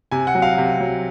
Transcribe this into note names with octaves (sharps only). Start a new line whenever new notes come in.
C3 G#5
F#5
F#3
F5
C3
F#3